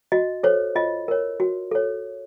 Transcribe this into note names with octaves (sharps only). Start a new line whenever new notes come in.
F#4 D#5
A4 C5 C#5
F4 D#5
A#4 C#5
F#4
A4 C#5